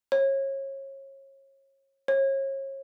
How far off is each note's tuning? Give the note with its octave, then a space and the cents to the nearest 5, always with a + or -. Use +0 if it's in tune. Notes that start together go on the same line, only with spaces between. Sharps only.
C#5 -30
C#5 -35